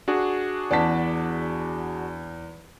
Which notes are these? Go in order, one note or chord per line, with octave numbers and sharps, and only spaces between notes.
D4 F#4 G#4
E2 D5 F#5 A5 B6